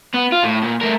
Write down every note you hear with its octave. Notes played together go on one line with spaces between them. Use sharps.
B3
F4
A2
A#2
A3 A#4